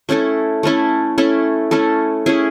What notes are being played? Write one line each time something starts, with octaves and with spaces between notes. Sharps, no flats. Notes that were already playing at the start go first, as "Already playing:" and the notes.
A3 C#4 E4 A4
A3 C#4 E4 A4
A3 C#4 E4 A4
A3 C#4 E4 A4
A3 C#4 E4 G#4